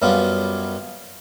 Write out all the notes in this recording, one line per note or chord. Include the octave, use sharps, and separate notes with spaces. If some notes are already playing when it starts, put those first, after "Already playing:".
F#2 F#3 G3 B3 C#4 F4